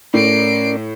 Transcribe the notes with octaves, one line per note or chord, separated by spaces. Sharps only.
A2 C#4 A#4 D5 C7 D7